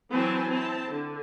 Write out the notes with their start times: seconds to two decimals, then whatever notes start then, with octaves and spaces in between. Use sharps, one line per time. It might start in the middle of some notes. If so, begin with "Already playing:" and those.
0.11 E3 F#3 C4 B4 G#5 A5
0.50 C4 E4 A5
0.88 D3